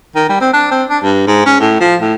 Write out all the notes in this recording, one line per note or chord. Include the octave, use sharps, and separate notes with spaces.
D#3
G3
C4
D4
C4
D4
G2
G#2
C#4
A2
F3
A2